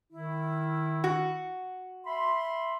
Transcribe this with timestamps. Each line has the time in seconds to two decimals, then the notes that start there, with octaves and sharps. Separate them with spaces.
0.12 D#3 E4
1.04 F#4
2.05 E5 B5 C6